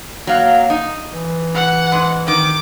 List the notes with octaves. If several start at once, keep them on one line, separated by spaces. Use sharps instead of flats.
F#3 A#3 F5
D#4
E3
F#5
G#2
D#3 D6